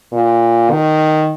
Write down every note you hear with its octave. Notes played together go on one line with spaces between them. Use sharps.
A#2
D#3